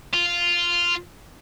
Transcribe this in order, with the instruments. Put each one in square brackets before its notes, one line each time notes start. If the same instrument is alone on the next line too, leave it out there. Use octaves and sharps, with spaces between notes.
[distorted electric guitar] F4